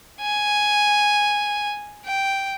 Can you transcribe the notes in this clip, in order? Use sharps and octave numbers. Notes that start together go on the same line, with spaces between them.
G#5
G5